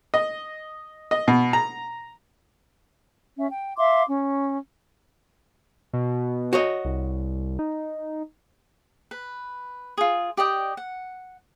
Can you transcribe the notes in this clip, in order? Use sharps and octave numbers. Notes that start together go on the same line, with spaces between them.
D#5
D#5
B2
A#5
C#4 E5
G5
E5 F5 C6 D6
C#4
B2
F#4 C#5 D#5
C2
D#4
B4
F4 G#4
G4 D5 D#5 G5
F#5